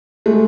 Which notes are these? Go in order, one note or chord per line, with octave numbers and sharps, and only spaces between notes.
G#3 A3